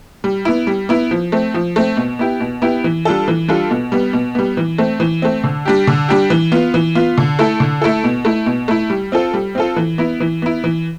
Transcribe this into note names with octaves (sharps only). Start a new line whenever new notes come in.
G3
B3 E4
G3
B3 E4
F3
A3 C4
F3
A3 C4
B2
B3 E4 G4
B2
B3 E4 G4
E3
G3 D4 F4 A4
E3
G3 D4 F4 A4
B2
G3 B3
B2
G3 B3
E3
A3 C4
E3
A3 C4
D3
G3 D4 G4
D3
G3 D4 G4
E3
B3 F4
E3
B3 F4
D3
A3 E4 A4
D3
A3 E4 A4
B2
A3 E4
B2
A3 E4
G3
C4 F4 A4
G3
C4 F4 A4
E3
B3 E4
E3
B3 E4
E3